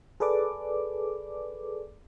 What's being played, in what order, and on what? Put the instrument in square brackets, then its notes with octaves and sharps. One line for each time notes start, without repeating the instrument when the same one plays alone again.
[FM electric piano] G#4 A4 B4 D5 D6